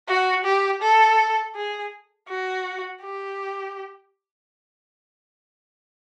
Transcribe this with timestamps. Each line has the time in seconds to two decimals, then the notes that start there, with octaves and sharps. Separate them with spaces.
0.08 F#4
0.45 G4
0.82 A4
1.56 G#4
2.29 F#4
3.02 G4